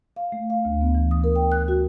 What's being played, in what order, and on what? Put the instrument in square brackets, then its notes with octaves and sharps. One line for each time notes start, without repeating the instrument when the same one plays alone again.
[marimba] F5
A3
F5
D2
B3
E3
D#6
A#4
G5
F#6
F#4